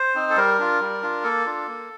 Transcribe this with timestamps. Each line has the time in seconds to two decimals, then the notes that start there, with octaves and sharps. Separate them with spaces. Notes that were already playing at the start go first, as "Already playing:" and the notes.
Already playing: C5
0.15 C4 D#4
0.30 A4
0.36 G3 A#4
0.59 D4 F4
0.80 G3
1.02 D4 F4
1.24 A#3 A4
1.46 D4 F4
1.67 A#3